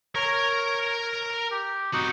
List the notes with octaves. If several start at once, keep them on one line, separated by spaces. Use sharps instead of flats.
A#4 C#5 A#5
G4
C4 D#4 F#4